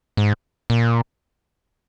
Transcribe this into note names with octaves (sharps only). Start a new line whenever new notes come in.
G#2
A#2